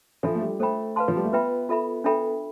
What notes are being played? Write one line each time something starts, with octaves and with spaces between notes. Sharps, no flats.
F3 D4 F4 A4 E5
A3
G3
A3 A4 C5 G5 B5
B4 F5 A5 C6
F3
G3
A3
B3 F4 B4 E5 G5 B5
F4 A4 E5 B5
D4 A4 E5 G5 B5